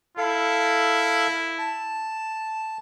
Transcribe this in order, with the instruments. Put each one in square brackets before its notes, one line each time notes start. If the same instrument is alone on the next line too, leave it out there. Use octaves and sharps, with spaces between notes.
[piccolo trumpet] E4 [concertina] A4 F5
[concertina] A5